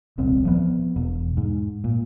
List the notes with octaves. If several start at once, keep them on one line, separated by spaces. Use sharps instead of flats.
D#1 C2 C4
F3 B3
E1
G#2
A#2